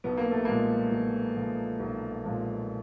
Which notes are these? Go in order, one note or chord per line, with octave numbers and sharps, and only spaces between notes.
B1 B3
A#3
A3
A#2 F3 G#3 A#3
B1
A#2 F3 G#3
B1
A#2 F3 G#3